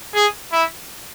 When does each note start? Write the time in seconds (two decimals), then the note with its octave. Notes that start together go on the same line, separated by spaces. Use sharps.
0.15 G#4
0.52 E4